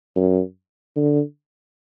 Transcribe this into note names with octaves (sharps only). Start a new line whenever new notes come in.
F#2
D3